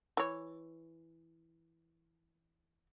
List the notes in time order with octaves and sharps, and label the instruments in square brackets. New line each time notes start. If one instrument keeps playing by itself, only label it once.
[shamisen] E3 C#5